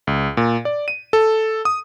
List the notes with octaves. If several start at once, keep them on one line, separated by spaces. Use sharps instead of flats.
C#2
A#2
D5
D#7
A4
D#6